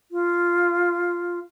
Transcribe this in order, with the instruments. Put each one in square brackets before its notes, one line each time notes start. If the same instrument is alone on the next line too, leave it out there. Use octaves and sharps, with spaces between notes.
[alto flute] F4